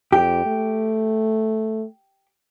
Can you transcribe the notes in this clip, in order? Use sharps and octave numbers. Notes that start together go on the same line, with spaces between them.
F2 G4
A3